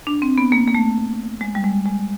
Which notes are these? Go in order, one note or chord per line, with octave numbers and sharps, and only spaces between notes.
D4
C4
B3
A#3
A#3
A3
G#3
G3
G#3
G#3